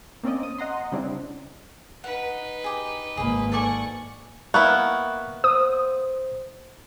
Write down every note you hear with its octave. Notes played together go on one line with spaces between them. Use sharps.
A#3 C4 C#4 D5 D#5
D#6
D#5 F#5 A#5 C6
C#3 G3 C4 D4 E4
D#4 B4 F#5
G4 G#4
G#1 A#3 G#4 B5
A4 D5 F#5 G#5 C#6
A#3 B3 E4 C#6 F#6
C5 D#6